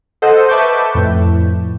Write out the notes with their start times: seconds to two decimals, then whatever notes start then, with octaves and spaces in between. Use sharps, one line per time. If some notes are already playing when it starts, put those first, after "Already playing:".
0.22 A4 C5 D#5 F#5
0.48 B4 E5 A5 C#6 D6 G6
0.95 F2 A2